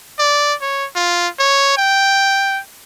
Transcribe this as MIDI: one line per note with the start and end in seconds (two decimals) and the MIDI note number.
0.19 0.54 74
0.62 0.86 73
0.96 1.28 65
1.39 1.72 73
1.77 2.60 79